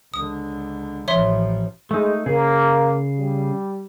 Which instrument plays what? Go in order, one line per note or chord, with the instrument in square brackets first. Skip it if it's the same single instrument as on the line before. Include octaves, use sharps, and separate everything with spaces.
[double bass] C#2 D3 [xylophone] D#6
[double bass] A1 F3 [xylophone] C#5 E5 C6
[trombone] G#3 [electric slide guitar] A3 D#4
[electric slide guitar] C#3 G#4 [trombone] A#3
[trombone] G3